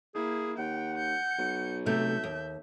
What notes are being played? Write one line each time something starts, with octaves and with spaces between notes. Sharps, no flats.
A#3 E4 G#4
D#2 F#5 G5
G6 C#7
B1
C3 A3 E5 G6
D#2